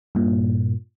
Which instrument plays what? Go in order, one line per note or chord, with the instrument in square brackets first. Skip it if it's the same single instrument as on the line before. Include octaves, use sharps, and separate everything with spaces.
[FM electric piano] G2 A#2